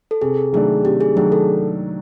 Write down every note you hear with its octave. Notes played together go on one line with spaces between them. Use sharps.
A4
C3 G#4
D#3 F#3 A3 D4 G#4
C3 G4
G#4
D#3 F#3 A3 D4 G#4
A4